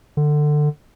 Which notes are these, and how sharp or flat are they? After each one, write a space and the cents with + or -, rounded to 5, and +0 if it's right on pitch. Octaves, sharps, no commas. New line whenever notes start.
D3 +20